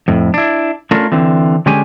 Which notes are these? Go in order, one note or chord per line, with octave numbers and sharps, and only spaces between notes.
F2 A2
D4 E4
A3 C#4 D4 F4 A#4
D3 E3 C4
D3 G#3 C#4 G4 G#5